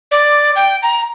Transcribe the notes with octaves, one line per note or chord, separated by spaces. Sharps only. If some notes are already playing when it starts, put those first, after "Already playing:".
D5
G5
A#5